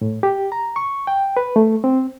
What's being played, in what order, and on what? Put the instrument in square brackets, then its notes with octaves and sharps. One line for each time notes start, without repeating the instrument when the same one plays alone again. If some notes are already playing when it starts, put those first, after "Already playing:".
[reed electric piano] A2
G4
A#5
C#6
G5
B4
A3
C4